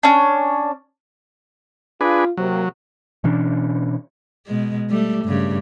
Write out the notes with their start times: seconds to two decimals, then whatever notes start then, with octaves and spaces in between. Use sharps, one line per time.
0.03 C#4 D4
2.01 D4 F4 G#4 B4
2.37 C3 F#3 A#3
3.24 B2 E3 C#4 D4
4.46 B2 G#3
4.90 G3 A3
5.25 G2 C#3